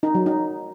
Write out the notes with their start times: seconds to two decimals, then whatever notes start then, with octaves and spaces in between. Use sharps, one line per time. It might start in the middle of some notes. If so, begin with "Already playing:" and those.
0.03 D#4
0.15 F#3
0.26 D#4